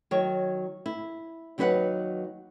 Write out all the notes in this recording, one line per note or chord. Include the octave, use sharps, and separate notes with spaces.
D#3 F#3 C#5
E4
D#2 F#3 D#4 B4 C5 F#5